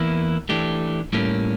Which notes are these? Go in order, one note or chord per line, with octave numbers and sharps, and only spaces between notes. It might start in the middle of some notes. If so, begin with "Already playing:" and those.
Already playing: E2 E3 A#3 E4
E3 A3 D4 G4
A2 G3 A#3 C#4